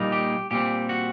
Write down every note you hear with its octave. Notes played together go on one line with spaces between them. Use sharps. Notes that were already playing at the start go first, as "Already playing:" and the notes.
Already playing: A#2 G3 A#3 D#4
G4
A#2 G3 C4 G4
F#4